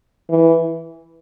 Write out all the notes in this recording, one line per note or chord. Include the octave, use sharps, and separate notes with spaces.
E3